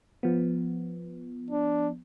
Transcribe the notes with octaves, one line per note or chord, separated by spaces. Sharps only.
F3 B3
D4